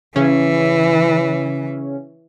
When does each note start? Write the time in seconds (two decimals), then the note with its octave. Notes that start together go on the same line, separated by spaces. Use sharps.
0.16 C#3 E3 C#4